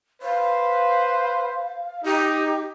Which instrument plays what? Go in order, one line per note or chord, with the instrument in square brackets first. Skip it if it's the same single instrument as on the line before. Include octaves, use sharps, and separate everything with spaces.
[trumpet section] B4 C5 [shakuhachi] F5
[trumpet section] D#4 [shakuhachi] G4